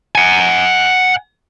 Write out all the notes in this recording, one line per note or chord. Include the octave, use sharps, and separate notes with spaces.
F#5 G#5